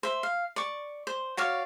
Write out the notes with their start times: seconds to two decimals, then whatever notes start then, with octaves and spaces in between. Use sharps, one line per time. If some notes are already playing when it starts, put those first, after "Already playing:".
0.03 C5 E5
0.23 F5
0.56 D5 C#6
1.07 C5
1.37 F#4 C#5 D5 F5